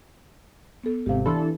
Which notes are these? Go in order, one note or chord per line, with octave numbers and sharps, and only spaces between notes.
B3 A4
G#1 C3 G4 F5
E3 D4 A4 B5 C6 E6